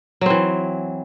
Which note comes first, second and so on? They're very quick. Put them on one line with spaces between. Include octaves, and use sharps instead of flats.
F#3 C4 E3